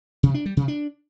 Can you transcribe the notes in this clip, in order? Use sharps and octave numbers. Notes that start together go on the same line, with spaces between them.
C3
D4
G3
C3
D4